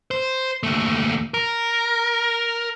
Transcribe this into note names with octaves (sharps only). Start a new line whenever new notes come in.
C5
D#2 A3
A#4